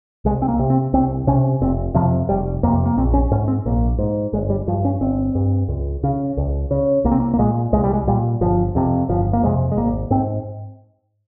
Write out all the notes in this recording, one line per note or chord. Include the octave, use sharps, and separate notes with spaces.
C2 G#3
C4
A#3
C3
C4
C2 C4
C3 C#4
F1 C4
F2 C3 F3
F1 G3
F2 C3 A#3
A#3
A#1 C4
C#4
G#2 C#4
C4
A#1 A#3
G#2
G1 G#3
G3
G2 F3
C#4
G1 C4
G2
C#2
C#3
C#2
C#3
C2 A#3
C4
A#3
A#3
A#2 G#3
C2 G#3
G3
G#3
A#2 G3
G1 F3
F2 C3
G1 F3
A#3
F2 C3 G#3
G#3
G#1 A#3
G#2 C4